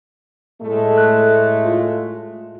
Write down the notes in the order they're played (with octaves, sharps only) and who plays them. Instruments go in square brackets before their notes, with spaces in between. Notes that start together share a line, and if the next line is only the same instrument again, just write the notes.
[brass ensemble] A2 G#3 A3
[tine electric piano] F#6
F4